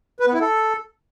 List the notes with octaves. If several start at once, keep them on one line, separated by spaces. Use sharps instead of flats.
B4
B3
E4
A4